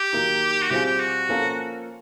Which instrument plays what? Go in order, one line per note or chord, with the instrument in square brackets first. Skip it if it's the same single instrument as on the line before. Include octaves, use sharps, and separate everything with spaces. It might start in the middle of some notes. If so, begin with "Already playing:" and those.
Already playing: [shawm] G4
[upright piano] D#3 F#3 A#3 D#4
[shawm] F#4
[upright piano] B2 G3 C4 F4 G#4 [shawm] G4
[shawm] G4
F#4
[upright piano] F3 A#3 C#4 F4 A4